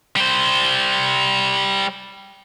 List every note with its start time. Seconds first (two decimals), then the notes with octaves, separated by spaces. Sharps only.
0.16 G3 C5